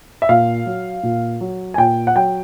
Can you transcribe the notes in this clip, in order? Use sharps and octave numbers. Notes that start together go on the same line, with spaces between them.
E5
A#2 F5
F#3
A#2
F#3
G#5
A#2 G5
F#5
F#3 G5